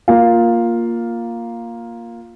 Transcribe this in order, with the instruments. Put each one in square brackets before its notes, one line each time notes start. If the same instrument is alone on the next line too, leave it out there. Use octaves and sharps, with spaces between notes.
[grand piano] A#3 F4 F5